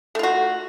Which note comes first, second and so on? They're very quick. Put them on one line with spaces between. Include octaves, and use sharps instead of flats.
A3 F4 F#4